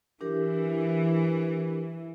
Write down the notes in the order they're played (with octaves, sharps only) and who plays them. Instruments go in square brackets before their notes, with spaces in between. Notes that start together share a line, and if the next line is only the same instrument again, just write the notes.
[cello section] E3 [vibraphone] D4 G4 A#4